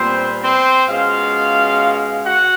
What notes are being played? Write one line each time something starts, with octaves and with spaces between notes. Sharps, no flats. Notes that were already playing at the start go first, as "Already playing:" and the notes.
Already playing: A#2 G3 B3 C4 C5
C4 C5
B2 G#3 C#4 F4 F5
F#4 F#5